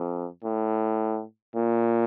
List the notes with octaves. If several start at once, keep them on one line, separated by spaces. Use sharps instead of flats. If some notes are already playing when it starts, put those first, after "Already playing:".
Already playing: F2
A2
A#2